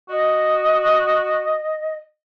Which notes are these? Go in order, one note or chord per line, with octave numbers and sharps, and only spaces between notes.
F#4 D#5